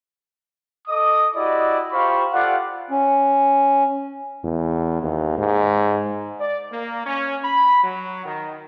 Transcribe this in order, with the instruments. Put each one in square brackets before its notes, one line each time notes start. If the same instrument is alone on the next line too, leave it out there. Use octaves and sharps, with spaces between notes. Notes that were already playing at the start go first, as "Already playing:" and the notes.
[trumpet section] A4 D#5 D6 D#6
E4 F#4 G4 D5 D#5
F4 G4 C5 F5 B5 C#6
F4 G4 A4 D5 F#5
[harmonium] C#4
[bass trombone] E2
D#2
G#2
[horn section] D5
A#3
C#4
B5
F#3
D#3